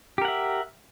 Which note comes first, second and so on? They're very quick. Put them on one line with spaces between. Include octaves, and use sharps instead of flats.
G4 A#4 F#5 E5